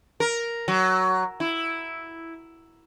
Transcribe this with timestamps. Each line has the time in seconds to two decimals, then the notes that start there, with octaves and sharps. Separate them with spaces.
0.20 A#4
0.68 F#3
1.40 E4